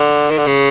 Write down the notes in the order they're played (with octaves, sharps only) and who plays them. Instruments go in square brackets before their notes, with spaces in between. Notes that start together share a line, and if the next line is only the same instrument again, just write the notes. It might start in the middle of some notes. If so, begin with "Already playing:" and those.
Already playing: [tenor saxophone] D3
D#3
D3
C#3